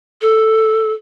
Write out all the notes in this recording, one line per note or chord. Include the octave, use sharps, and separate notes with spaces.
A4